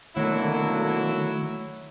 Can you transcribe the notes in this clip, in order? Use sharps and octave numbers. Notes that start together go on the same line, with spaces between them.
B2 D3 D#3 F#3 A3 A#3 E4